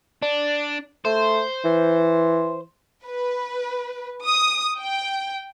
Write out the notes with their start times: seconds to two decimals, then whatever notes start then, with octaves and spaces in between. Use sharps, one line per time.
0.22 D4
1.05 A3 C5
1.65 E3
3.05 B4
4.24 D#6
4.80 G5